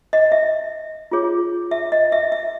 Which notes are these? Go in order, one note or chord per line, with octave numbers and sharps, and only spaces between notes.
D#5
E5
F4 G#4 C#5
E5
D#5
E5
E5